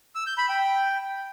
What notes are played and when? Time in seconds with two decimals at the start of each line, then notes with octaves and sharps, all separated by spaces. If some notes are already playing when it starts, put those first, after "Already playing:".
0.15 E6
0.27 G6
0.38 B5
0.49 G5